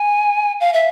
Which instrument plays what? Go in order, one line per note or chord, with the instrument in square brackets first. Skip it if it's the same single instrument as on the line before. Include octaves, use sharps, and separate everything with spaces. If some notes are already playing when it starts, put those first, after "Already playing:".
Already playing: [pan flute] G#5
F5
E5